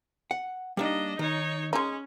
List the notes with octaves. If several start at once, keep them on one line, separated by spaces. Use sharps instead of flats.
F#5
G3 A#3 D4 D#4 D#5
D#3 D#4 C#5
G#3 C#4 D#4